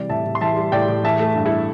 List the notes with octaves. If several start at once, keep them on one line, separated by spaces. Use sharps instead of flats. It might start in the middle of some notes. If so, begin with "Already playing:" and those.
Already playing: C3 E3 G3 D5
A2 E5 A5
A2
C6
E3 E5 A5
G3
A2 D5 G5
A2
E3 E5 A5
A3
G2
E4 A4